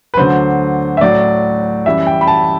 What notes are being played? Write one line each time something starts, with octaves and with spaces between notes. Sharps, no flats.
B4
D2 D3 F#3 C5
E5
A2 F#3 D5
F#2 E3 G3 E5
G5
B5
A5